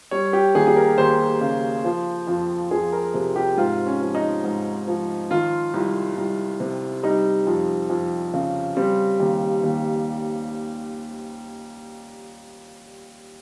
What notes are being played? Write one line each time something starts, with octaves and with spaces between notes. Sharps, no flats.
G3 C#5
G4
D#2 G#4
G#4
A#4
D#2 C5
C#3
F3
F2
F2 G#4
A#4
C3
G4
G#2 F4
C#4
F3
D#4
G#2
F3
D#3 F4
C2
C2
C3
G3 D#4
F2
F2
C#3
G3 C4
D#2
D#2